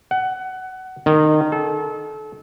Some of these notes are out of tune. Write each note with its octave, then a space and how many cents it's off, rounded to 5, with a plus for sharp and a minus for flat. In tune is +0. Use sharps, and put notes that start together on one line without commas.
F#5 +20
D#3 -20
A4 -30